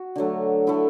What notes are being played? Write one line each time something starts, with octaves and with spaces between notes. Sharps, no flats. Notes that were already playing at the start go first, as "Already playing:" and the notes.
Already playing: F#4
D3 F#3 A3
D3 A3 E4